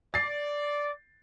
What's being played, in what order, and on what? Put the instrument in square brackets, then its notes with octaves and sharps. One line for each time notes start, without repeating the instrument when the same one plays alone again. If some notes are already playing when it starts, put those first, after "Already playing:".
[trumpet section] D5 [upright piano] A6 C7